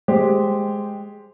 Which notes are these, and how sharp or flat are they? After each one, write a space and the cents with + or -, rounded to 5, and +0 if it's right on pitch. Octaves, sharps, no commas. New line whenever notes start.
G#3 +0 G4 +0 C5 +0